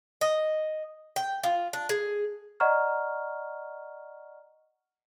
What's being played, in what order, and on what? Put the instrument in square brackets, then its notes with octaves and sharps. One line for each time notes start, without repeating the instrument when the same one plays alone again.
[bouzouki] D#5
G5
F4
D4
G#4
[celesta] D5 D#5 F#5 A#5 C#6 F6